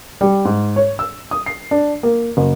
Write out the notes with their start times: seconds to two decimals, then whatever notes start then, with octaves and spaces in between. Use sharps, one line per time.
0.21 G3
0.45 G#2
0.76 C#5
0.99 E6
1.31 D#6
1.46 C7
1.71 D4
2.03 A#3
2.37 F#1